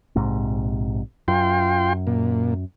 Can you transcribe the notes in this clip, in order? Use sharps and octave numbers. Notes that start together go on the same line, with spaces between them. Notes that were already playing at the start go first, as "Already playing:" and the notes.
A#1 G#2 C3
F#2 F4 G5 C6
A#2